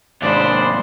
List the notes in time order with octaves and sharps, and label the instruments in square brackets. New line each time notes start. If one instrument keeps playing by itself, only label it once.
[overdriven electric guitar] D#2 G#2 [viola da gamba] G#3 [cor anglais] D4 [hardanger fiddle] C5 B5